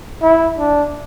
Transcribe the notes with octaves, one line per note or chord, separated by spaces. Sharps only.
E4
D4